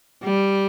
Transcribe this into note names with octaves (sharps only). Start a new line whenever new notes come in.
G3